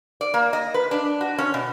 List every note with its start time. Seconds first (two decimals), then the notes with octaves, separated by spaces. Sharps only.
0.21 D5
0.34 A#3
0.53 D#5
0.74 B4
0.91 D4
1.21 F#4
1.38 C#4
1.54 B2